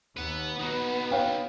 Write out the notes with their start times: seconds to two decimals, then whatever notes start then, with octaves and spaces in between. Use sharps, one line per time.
0.17 D#2 B4 F#5
0.59 B3 D#4 F#4
1.11 C#5 F5 G5